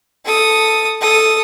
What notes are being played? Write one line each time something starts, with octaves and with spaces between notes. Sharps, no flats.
A4 D#6
A4 D#6